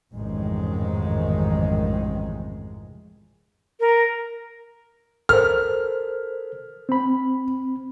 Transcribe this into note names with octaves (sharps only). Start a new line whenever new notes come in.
A1 F2 G#2 C3 D#3 G#3
A#4
A4 A#4 C5 F6
C4 B5